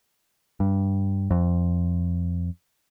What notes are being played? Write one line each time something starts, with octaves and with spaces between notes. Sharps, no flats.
G2
F2